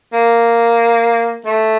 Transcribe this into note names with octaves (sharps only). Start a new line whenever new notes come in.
A#3
A3